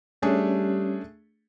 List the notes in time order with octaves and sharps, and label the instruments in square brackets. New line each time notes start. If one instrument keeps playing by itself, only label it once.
[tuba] G3 [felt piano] A3 D4 G#4 [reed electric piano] C#4